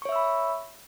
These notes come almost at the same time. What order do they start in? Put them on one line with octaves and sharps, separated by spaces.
C#6 C#5 E5 E6 B5